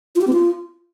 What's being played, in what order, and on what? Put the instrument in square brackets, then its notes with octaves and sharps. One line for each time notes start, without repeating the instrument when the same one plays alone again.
[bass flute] F4
G4
C4
F4